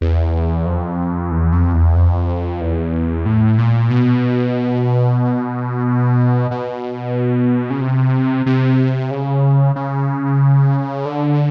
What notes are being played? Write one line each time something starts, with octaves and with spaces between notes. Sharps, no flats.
E2
F2
E2
F2
E2
F2
E2
A2
A#2
B2
B2
C#3
C3
C3
C#3
C#3
D3